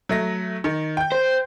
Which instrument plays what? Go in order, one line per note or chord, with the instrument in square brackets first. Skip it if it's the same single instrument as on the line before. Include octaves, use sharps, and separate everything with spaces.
[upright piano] F#3 A3 A#6
D#3
G5 G6
[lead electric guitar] C5